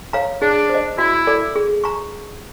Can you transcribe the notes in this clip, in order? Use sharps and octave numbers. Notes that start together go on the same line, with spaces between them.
C#5 F5 A#5
D4 G#4
C5 D#5
E4 F#4
A4 D5
G#4
A#5 C#6